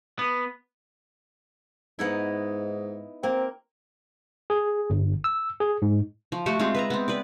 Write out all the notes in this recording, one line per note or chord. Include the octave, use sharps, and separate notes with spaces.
B3
G#2 B3 D#4 E4
A#3 C4
G#4
G1
E6
G#4
G#2
F3
A3 F#4 G4
G#3 C4 F4
B4 E5 A#5
B3 C4
B4 D5